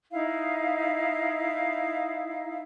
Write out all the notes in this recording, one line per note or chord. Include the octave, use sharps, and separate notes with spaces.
D#4 E4 F5